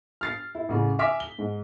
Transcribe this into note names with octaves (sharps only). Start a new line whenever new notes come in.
F6 A6 C7
E4
A1 C#3
E5 G#5 D6 F6 B6
G7
G#2